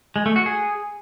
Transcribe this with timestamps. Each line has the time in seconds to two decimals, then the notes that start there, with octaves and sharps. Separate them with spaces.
0.16 G#3
0.26 A3
0.36 F#4
0.46 G#4